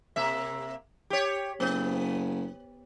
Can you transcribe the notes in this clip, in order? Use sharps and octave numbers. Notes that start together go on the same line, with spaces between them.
C3 A#3 E5
G4 C#5
F#1 B3